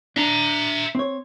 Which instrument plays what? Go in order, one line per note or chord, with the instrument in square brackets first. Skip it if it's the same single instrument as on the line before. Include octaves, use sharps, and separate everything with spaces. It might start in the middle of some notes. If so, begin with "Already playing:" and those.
[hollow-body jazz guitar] D4 [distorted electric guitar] E5 A#5
[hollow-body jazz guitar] C4 C#5